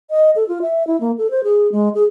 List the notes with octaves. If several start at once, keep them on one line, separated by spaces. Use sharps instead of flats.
D#5
A4
F4
E5
E4
A#3
A4
C5
G#4
G#3
G#4